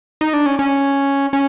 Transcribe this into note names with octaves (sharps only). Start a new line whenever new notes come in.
D#4
D4
C#4
C#4
C#4